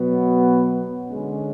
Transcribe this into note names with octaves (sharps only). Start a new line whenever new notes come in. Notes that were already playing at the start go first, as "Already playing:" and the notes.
Already playing: B2 F#3 B3 F#4
D3 G#3 C#4